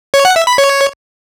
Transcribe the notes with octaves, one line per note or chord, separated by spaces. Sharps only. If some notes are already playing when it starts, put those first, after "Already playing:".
C#5
F#5
E5
B5
C#5